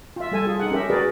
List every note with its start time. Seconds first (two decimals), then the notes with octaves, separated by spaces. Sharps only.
0.16 F4 E5
0.32 G3 A4 G#5 A5
0.45 F4 G#4
0.60 D#4 F#5
0.71 C#4 G4 A#4 E5
0.90 F#4 G#4 A#4 B4 D5